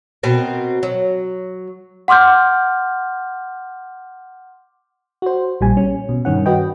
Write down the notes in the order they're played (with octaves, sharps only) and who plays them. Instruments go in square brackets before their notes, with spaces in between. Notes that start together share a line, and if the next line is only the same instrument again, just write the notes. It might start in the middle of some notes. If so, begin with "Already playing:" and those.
[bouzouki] B2 C4 A#4
F#3
[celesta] F#5 C6 D6 F6 G6
[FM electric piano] F#4 C5
A#1 A#2 G3 G#5
C#4
B2
G2 D#3 C#4 F#5
F#4 B4 D#5 G5